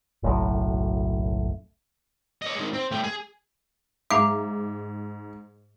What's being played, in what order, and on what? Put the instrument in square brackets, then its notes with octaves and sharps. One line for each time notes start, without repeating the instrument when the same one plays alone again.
[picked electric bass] F#1 B1 F#2 A2
[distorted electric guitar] C#5 D#5
D#3 G#3
C4
A3 G5
G#4
[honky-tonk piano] G#2 [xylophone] E5 F5 A#5 [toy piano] D6